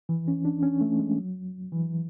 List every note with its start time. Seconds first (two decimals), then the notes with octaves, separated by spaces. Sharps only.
0.09 E3
0.28 C#4
0.45 D4
0.63 C#4
0.81 A3
0.99 G#3
1.18 F#3
1.72 E3